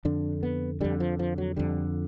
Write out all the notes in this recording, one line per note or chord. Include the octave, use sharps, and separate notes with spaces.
F2 D3 D4
B3
F2 D3 G3
F3
F3
F#3
F2 D3 G3